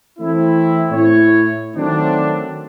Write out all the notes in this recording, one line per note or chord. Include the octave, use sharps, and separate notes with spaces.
E3 A3 C4 E4
A2 E4 C#5
D#3 F#3 A3 C4 D4